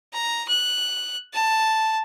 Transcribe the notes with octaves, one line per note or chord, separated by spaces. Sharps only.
A#5
F#6
A5